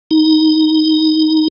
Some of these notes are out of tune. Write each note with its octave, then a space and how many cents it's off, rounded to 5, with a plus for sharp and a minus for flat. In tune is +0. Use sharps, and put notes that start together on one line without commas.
D#4 +10